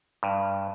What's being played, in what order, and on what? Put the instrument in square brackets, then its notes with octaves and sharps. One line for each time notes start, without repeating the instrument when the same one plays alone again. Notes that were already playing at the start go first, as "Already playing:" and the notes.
[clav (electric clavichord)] G2